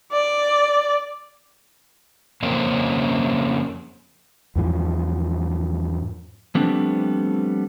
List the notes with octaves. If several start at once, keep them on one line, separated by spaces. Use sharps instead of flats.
D5
F2 C#3 A#3 C4 C#4
E2 G#2 F3
F3 G3 A3 B3 C4 D4